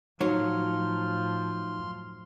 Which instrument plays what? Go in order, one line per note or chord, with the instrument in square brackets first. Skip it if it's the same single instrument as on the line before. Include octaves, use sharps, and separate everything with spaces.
[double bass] A2 F3 [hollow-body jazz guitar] F#3 C#5 [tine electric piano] D#4 [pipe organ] C6 F6